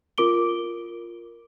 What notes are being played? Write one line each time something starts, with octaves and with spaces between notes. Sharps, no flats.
F4 A#4 D6 D7 G7